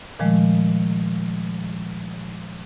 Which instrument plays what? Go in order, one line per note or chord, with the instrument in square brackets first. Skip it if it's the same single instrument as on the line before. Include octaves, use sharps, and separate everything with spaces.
[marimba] A#2 D#3 F3 G#3 A3